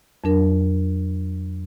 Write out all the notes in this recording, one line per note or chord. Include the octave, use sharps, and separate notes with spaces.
F2 F#3 D4 A#4